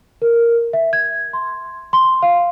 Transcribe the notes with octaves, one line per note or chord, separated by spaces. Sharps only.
A#4
E5
G#6
C6
C6
F5